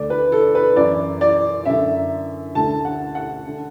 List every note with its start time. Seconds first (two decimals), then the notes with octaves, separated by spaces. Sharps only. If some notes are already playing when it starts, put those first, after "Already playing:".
Already playing: D2 D3 D5
0.10 B4
0.32 A4
0.55 B4
0.76 F#2 E3 D5
1.21 D5
1.65 F#2 D3 E5
2.55 D2 D3 A5
2.85 F#5
3.15 F#5
3.47 D3